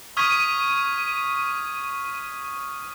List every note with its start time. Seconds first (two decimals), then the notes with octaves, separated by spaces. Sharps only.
0.17 C#6 D#6 F6 G#6 B6 D#7